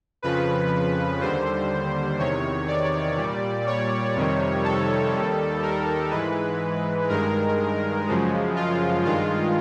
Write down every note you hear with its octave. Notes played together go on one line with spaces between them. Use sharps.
F2 C#3 F3 B4
D#2 D3 G3 C5
E2 C3 D#3 C#5
D5
A#2 G3
C#5
F2 C3 D#3 G3
A4
D#2 D#3 G3
A#4
G#2 E3 G#3 B4
G2 D#3 G#3 A#4
F#2 C#3 F3 G#3
F4
G2 D#3 G#3 F4